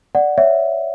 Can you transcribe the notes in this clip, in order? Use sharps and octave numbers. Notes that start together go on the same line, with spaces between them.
D5 F#5
C#5 E5